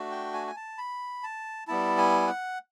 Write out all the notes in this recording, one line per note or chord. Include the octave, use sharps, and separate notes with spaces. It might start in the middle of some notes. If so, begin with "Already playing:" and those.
Already playing: A3 D4 F#4
G5
G#5
G#5
A5
B5
A5
G3 B3 E4 A5
G#5
F#5